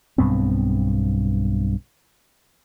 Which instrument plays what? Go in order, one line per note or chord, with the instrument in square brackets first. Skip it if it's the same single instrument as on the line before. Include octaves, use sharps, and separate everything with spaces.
[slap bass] B1 G2 B3 C4